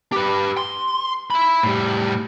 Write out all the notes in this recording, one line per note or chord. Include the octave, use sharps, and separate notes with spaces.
G4 B4
C6
E5 B5
A2 G3